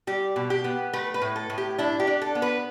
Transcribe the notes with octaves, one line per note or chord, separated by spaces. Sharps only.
G3 G4
B2
G4
B3
A3 B4
B4
A2
A4
A2
G4
D4 E4
G4
D4
A4
B3
B4